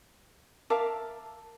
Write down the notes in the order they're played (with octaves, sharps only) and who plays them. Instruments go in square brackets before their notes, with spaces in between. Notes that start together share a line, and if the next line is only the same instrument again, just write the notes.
[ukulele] A#4 E5 F5 [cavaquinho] A5 D6